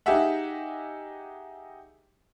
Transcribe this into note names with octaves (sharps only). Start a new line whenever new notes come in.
D#4 G4 G#4 D#5 E5 F#5